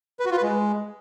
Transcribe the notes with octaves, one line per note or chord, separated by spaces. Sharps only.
B4
F#4
F4
B4
G#3